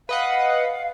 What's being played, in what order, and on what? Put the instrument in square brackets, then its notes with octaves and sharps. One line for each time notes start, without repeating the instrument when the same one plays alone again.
[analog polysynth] B4 D#5 F#5 [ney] F5